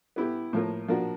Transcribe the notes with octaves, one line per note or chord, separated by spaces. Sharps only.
B3 E4 G4
A2 F3 A#3
F3 A#3 D4 F#4